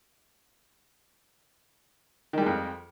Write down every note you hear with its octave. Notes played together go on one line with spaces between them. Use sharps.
F2 D#3 G3 G#3